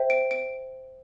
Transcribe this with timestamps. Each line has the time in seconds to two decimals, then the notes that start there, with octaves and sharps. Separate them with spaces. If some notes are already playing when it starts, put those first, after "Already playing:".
Already playing: C5 E5 G5
0.10 D7
0.31 D7